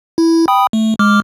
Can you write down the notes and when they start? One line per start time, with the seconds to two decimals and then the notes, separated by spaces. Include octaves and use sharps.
0.18 E4
0.48 G5 B5 D#6
0.73 A3
0.99 G#3 D6 F6